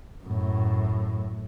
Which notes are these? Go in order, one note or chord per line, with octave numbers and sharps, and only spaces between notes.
F#2 A2